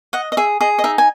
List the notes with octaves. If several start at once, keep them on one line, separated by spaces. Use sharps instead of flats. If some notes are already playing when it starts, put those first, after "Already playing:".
D#5 F#5
D#5
G#4 E5
G#4 D#5
D#5
D#4 E5
G#5